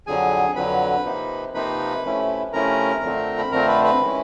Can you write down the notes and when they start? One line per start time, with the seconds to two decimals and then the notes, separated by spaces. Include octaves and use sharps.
0.07 F2 D3 F#3 G#4 G#5
0.55 F2 D3 F#3 B4 B5
1.05 C3 F3 A#3 D#4
1.54 C3 F3 A#3 D#4 B4 B5
2.04 C3 F3 A3 C#4 E4
2.53 C3 F3 A3 C#4 E4 A#4 A#5
3.03 F2 D3 F3 A3 C4
3.38 B5
3.51 F2 D3 F3 A3 C4 A#4 A#5
3.68 B4 B5
3.84 B4 B5
4.01 D#3 G#3 C#4 E4